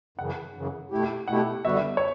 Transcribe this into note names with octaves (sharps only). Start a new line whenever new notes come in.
F#2 C#3 E3 F#5
F#2 C#3 E3
B2 A3 E4 G4
B2 A3 E4 G4 F#5
D3 G3 B3 F#4 E5
C#5